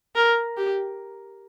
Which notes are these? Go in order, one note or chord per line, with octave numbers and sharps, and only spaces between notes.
A#4
G4